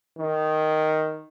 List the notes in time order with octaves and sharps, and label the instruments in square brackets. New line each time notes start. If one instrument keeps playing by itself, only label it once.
[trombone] D#3